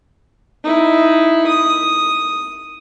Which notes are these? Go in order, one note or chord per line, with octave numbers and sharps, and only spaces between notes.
D#4 E4
D#6